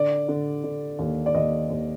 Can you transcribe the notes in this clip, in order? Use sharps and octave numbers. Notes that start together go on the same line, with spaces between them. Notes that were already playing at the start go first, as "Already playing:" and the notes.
Already playing: D3 D5
D3
D3
D#2
D5
D#2 D#5
D#2